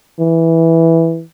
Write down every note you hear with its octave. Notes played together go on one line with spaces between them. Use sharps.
E3